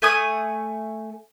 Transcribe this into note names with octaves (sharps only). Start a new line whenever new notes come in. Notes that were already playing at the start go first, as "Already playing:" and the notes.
A3 G#5 D#6